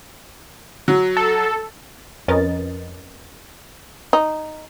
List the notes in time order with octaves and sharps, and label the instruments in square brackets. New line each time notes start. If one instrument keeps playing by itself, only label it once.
[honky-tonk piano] F#3
[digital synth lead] A4
[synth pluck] F2 C#4 A#4 B4 D#5 A6
[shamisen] D#4